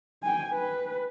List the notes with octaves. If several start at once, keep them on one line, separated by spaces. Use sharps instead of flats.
G5 G#5
B4